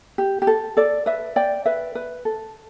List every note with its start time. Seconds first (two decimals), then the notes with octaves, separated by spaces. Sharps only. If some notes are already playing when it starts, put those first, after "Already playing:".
0.18 G4
0.42 G4
0.47 A4
0.77 A4 D5
1.06 B4 E5
1.36 D5 G5
1.65 B4 E5
1.95 B4
2.25 A4